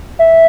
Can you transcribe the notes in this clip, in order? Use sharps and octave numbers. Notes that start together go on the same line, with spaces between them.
E5